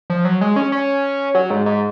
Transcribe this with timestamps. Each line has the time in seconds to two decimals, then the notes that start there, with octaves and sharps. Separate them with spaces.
0.10 F3
0.25 F#3
0.41 G#3
0.56 C#4
0.72 C#4
1.35 F#3
1.50 G#2
1.66 G#2